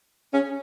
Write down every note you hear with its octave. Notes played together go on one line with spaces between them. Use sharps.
C#4